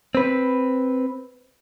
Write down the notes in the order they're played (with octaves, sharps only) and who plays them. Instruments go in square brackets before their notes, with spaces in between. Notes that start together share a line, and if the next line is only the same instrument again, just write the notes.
[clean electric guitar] C4 B4